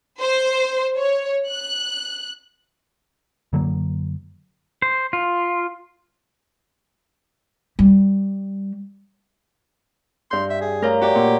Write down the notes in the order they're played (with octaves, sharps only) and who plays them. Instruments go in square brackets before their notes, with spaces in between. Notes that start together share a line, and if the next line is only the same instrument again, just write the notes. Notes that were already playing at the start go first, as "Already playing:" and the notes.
[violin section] C5
C#5
F#6
[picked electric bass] F#2 D3 F#3 A#3
[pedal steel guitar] C5
F4
[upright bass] G3
[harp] G2 G6 [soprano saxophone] C6
[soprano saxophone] E5
G#4
[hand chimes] A3 C#5 F5 [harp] A#4 A#5
[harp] F#4 D5 [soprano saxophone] G4
[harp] A#2